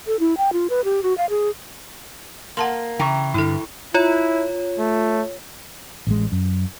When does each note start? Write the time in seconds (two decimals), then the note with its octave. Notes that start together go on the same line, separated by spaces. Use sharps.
0.07 A4
0.20 E4
0.38 G5
0.53 F4
0.70 B4
0.85 G4
1.03 F#4
1.18 F5
1.30 G#4
2.57 A#3 F#5 A5 C6
2.99 C#3 E3 G5 A#5 C#6
3.34 G2 D3 E4 A4
3.94 E4 F4 C#5
4.79 A3
6.07 A1 G#3
6.32 F#2